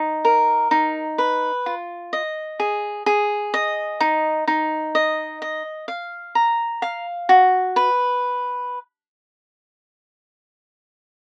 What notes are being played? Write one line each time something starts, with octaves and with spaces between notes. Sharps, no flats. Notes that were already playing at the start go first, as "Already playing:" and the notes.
Already playing: D#4
A#4
D#4
B4
F4
D#5
G#4
G#4
D#5
D#4
D#4
D#5
D#5
F5
A#5
F5
F#4
B4